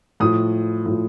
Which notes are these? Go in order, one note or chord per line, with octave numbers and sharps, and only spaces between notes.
A2 F3 D#6
A2 F3